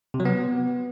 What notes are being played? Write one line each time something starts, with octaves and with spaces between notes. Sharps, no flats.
C3
F#3
B3